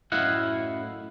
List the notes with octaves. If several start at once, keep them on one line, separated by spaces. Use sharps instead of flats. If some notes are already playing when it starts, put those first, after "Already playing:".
F#2 A2 E4 D#5 F5 F#5